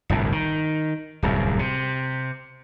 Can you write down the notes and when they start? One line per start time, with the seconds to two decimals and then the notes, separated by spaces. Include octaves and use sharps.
0.09 G1 C2 A2
0.32 D#3
1.22 D1 C2 F#2
1.59 C3